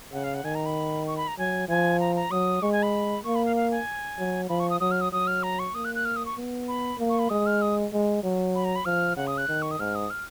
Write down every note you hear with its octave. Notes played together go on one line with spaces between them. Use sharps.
C#3 F#5
F5
F#5
D#3 G#5
A#5
B5
C#6
B5
A#5
F#3 G#5
F3 G#5
A#5
A#5
F#3 D#6
G#3 C#6
G#5
B5
A#3 C#6
B5
F5
F5
G#5
F#3
F3 B5
C#6
D#6
F#3 D#6
F6
D#6
F#3 D#6
F6
A#5
C#6
A#3 D#6
F#6
F#6
F6
D#6
C#6
B3
B5
A#3
C#6
B5
G#3 D#6
F6
D#6
G#3
F#3
B5
A#5
B5
F3 F6
C#3 F#5
D#6
F#6
D#3
C#6
D#6
G#2 F6
D#6
F6